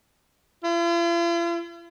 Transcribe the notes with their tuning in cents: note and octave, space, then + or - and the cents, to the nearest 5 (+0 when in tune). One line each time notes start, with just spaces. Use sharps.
F4 -45